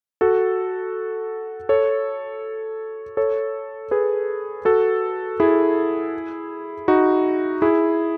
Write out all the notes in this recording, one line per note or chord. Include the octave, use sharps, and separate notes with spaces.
F#4 A4
A4 C#5
A4 C#5
G#4 B4
F#4 A4
E4 G#4
D#4 F#4
E4 G#4